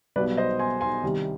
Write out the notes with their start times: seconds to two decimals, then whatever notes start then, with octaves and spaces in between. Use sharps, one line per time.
0.16 B1 B2 G3 B4 D5
0.37 C5 D#5
0.59 G#5 C6
0.81 G#5 C6
1.03 C2 C3 D#3 G3